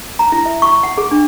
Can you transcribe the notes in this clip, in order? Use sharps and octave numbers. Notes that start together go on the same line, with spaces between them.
A#5
E4
E5
C#6
F#5
G#4
D4